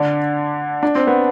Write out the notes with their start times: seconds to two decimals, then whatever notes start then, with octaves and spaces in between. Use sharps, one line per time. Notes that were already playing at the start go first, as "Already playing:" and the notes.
Already playing: D3 D4
0.83 D4
0.95 C4
1.07 B3